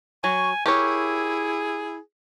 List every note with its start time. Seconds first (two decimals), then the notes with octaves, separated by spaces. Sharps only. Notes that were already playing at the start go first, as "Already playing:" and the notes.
0.24 F#3 G#5 C#6
0.66 E4 G4 G#4 A#4 C#5